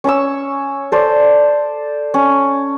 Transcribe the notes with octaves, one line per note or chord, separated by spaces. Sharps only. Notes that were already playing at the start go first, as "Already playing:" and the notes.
C#4 C#5 C#6 E6
A4 C5 D5
C#4